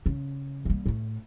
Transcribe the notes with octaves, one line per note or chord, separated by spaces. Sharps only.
C#3
G3 A#3
A2 A3